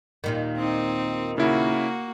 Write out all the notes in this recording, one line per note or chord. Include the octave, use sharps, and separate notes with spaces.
D#2 A#2 D#3
C4 D#4
C#3 A#3 E4 F#4